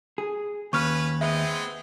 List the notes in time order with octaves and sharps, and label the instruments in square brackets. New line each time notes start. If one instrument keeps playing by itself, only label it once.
[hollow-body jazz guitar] G#4
[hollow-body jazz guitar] D#2 [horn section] C#4 B4 [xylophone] C#6 F6
[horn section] G#3 B3 C4 [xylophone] E5